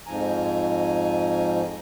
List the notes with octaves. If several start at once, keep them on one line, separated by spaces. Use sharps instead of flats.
F2 G#2 F3 G#5 A#5